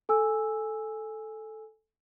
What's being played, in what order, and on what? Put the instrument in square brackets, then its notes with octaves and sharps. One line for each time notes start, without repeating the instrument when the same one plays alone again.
[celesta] A4 G#5 E6